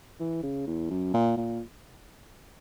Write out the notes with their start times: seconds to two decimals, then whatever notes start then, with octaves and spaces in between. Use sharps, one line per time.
0.20 E3
0.44 C#3
0.67 E2
0.91 F#2
1.14 A#2
1.37 A#2